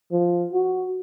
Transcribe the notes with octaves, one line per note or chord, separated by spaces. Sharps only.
F3
F#4